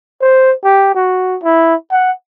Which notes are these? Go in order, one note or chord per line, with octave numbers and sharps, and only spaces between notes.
C5
G4
F#4
E4
F#5